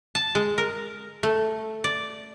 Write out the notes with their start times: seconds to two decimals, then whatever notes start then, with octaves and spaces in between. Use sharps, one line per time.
0.15 A5
0.35 G#3
0.58 A#4
1.23 A3
1.84 D5